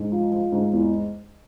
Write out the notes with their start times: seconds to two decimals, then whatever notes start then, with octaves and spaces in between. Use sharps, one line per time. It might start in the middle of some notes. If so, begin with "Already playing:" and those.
Already playing: G#2
0.12 F3
0.32 F3
0.52 G#2
0.73 E2